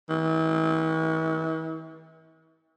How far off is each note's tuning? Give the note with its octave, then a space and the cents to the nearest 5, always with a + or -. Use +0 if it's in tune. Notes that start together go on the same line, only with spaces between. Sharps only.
E3 -45